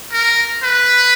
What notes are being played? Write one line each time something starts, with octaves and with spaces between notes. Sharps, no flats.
A#4
B4